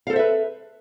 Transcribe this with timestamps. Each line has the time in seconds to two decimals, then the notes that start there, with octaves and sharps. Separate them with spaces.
0.07 F5
0.10 A4
0.13 C5
0.16 E5
0.19 B4